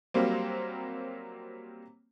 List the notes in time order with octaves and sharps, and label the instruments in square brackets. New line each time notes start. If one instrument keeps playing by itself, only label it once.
[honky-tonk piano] F#3 G3 A#3 C4